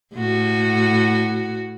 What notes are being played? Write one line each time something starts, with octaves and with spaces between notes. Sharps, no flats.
A2 F#4